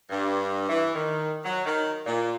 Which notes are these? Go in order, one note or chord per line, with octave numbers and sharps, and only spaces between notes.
G2
E3
D#3
F#3
D#3
A#2